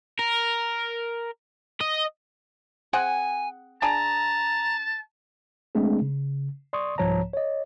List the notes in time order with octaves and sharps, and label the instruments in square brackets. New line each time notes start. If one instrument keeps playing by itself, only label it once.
[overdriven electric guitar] A#4
D#5
[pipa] C4 G#4 F#5 [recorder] G#5
[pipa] D4 G#4 [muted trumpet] A5 [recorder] A#5
[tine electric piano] G#3 A3 C4 D4 G#4
C#3
D5 C6 C#6 D#6
C2 G#2 F3 C#5 A5 A#5
C#5 D#5